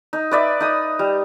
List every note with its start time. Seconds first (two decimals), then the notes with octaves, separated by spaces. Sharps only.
0.13 D#4
0.31 B4 D5 E5
0.60 D#4 D#6
0.99 G3